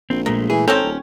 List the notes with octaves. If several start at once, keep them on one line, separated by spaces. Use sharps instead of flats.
A#1 C4
A#2 G#3 A3 A#4
E3 G#4
G#1 C4 C#4 A4 G5 A#5
D#1